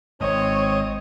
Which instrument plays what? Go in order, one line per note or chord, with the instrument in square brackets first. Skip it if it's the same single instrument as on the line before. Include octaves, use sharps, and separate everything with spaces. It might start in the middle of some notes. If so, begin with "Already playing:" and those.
[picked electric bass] G#1 G#2 [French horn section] C4 [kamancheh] C#5 [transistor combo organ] D#5